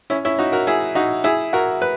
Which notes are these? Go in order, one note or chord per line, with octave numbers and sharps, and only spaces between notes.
C#4 E4
C#4 E4
D#4 F#4
F#4 A#4
E4 G#4
D#4 F#4
E4 G#4
F#4 A#4
B4